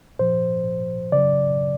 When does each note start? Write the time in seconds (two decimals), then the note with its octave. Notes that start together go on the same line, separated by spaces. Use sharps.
0.19 A#2 F3 C5
1.12 C#3 F#3 D5